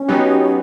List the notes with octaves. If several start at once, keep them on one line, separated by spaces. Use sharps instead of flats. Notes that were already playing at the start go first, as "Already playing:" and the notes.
Already playing: C#4
F#3 B3 D#4 G4